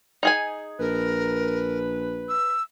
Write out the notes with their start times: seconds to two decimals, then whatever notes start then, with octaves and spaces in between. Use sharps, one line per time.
0.23 D#4 G#4 G#5
0.79 A#1 A#4 B4
2.29 E6